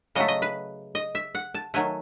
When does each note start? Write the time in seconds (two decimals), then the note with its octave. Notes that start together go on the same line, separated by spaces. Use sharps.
0.15 C#3 F#3 A3 D#5
0.28 D#5
0.42 B4
0.95 D#5
1.15 E5
1.35 F#5
1.54 A5
1.74 D#3 F#3 A3 G#5